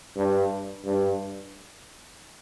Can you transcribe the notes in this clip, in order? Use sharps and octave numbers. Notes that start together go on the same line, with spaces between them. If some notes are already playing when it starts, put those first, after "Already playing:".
G2
G2